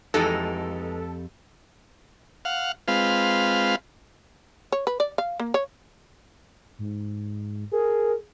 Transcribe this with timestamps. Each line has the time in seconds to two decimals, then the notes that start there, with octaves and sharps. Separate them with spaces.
0.14 F2 E3 G#3 D#4 G4 A4
2.45 F5 F#5
2.88 G#3 C4 F4 B4 F5
4.72 C#5
4.87 B4
5.00 D5
5.18 F5
5.39 A#3
5.54 C#5
6.79 G#2
7.72 G#4 A#4